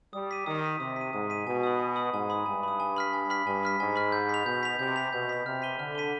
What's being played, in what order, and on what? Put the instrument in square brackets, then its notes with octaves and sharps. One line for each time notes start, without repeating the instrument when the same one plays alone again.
[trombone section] G3 [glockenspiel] D#6
[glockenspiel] B6 D#7
[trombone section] D#3 [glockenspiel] D#6
[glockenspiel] B6 D#7
[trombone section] C3 [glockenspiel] D#6
[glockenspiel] B6 D#7
[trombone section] G#2 [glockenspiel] D#6
[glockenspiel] B6 D#7
[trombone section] B2 [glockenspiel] G#5
[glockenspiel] B5 D#6
G#5
B5 D#6
[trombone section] G#2 [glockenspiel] G#5
[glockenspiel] B5 D#6
[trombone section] G2 [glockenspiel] G#5
[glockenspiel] B5 D#6
G#5
B5 F6 B6
G#5
B5 F6 B6
[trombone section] G2 [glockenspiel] G#5
[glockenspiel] B5 F6 B6
[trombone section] G#2 [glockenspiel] G#5
[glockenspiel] B5 F6 B6
G6
B6 F7
[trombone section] B2 [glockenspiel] G6
[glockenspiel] B6 F7
[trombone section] C3 [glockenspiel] G6
[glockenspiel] B6 F7
[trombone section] B2 [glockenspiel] G6
[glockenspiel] B6 F7
[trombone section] C3 [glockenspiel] F6
[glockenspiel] B6 D#7 G7
[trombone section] D3 [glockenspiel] F6
[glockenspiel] B6 D#7 G7